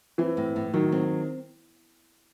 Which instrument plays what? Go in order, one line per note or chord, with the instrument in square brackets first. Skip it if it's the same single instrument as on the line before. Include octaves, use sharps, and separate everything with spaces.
[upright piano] E3 [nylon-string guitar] C4
[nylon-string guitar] A2
A2
[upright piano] D#3 [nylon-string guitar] F#3
[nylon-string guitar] C4